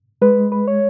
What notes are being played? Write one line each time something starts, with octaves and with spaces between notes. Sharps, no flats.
G#3 B4
B4
C#5